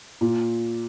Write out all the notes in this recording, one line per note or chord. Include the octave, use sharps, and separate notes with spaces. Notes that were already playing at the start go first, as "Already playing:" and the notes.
A#2